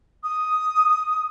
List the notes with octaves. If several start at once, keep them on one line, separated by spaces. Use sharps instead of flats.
D#6